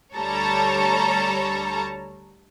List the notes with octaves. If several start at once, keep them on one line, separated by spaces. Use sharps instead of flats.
D2 G3 A4 C#5 A5 A#5